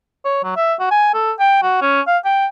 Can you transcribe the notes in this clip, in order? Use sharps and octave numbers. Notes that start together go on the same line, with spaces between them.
C#5
F#3
E5
F#4
G#5
A4
G5
F#4
C#4
F5
G5